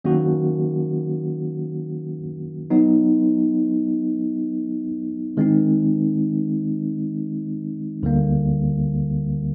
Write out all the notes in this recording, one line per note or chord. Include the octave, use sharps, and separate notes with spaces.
D#3 F#3 A#3 C#4 F#4
F#3 B3 D#4
D#3 G#3 C4 D#4
D2 D3 G3 A#3